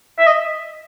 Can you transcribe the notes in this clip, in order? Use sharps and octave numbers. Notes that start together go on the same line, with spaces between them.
E5
D#5